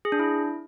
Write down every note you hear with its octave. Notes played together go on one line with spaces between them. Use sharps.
G#4
D4
E4